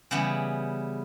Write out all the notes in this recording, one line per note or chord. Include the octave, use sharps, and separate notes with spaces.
C#3 E3 G3 B3